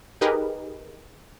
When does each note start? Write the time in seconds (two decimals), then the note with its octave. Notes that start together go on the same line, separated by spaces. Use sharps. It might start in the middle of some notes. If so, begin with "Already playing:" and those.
0.21 D#4 G4 G#4 A#4 B4 D#5